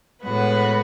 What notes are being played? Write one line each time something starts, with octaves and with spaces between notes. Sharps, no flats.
A2 G#3 B3 F#4 B4